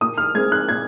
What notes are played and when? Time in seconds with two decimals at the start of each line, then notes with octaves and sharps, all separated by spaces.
0.01 A#2 D#6
0.18 F6
0.35 G#3 C4 G#6
0.52 F#6
0.69 A#2 G#6